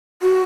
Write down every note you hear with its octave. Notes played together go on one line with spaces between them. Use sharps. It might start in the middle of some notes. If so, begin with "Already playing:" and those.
F#4